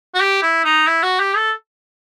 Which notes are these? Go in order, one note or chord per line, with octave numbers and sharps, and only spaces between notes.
F#4
G4
E4
D#4
E4
F#4
G4
A4